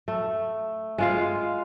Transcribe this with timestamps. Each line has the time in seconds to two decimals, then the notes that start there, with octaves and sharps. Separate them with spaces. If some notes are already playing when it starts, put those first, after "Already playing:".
0.08 A3
0.98 G#3 F4 F5